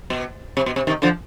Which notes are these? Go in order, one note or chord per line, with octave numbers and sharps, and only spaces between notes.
B2
C3
B2
C3
C3 D#3
D3 F3